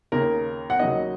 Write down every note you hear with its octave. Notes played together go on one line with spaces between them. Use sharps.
D#2 C#3 A#3 A#4
F#5
D#2 C#3 F#3 D#5